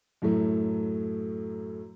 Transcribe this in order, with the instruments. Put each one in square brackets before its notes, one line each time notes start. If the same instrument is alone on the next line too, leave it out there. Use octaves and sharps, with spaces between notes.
[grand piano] F#2 A2 F#3 A3